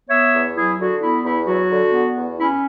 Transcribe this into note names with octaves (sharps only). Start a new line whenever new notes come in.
B3 C#5 E5
E2
F#3 E4 G#4
D3 F#4
B3 E4
E2 E4
F#3 F#4
D3
B3
E2
C#4 E4